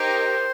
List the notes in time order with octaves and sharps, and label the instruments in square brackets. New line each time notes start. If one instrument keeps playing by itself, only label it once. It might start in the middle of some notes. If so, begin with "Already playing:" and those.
Already playing: [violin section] D#4 G4 A#4 [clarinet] C5